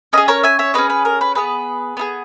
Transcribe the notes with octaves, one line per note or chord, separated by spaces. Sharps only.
C#4 G#4 B4 D#5
A#4 C#5
E5 G#5
C#5 E5
C#4 G#4 B4 D#5
B4
A#4
B4
B3 D#4 G#4 B4
B3 D#4 G#4